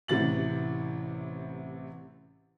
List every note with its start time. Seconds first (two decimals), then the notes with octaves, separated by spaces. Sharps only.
0.08 A1 C3 E3 A6 F#7